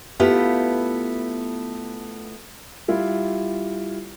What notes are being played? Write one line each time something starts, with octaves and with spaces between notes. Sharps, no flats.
A3 B3 E4 F4 G4
G3 E4 F4